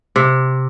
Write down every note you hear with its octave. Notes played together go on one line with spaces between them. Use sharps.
C3